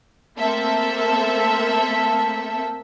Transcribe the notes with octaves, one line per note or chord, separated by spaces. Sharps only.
A3 A#3 C4 A4 E5